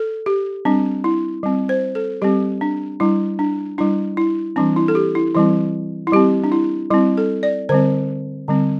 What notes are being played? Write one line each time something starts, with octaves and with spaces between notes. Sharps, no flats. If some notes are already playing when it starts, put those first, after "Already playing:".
Already playing: A4
G4
G3 C4 D4
E4
G3 C4
C5
A4
G3 C4 G4
D4
G3 D4 E4
D4
G3 D4 E4
E4
E3 G3 C4 D4
E4
A4
G4
E4
E3 G3 C4 E4
E4
G3 C4 G4
D4
E4
G3 C4 E4
A4
D5
D3 G3 C4 C5
D3 G3 C4